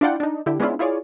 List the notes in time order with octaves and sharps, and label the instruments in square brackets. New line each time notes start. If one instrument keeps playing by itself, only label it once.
[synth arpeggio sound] D4 E4 F4 D5 F#5 G5
D4 D#4
D3 E4 G4
G#3 B3 C#4 D4 E4 F4
E4 F4 G#4 C#5 D5